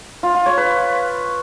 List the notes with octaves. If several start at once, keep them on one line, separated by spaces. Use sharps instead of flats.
F4
F4
C#5
B4